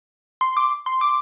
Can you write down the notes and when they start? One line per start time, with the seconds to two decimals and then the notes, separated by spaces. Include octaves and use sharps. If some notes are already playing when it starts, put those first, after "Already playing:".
0.41 C6
0.57 D6
0.86 C6
1.01 D6